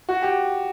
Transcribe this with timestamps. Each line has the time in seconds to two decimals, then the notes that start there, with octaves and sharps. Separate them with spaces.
0.09 F#4
0.22 G4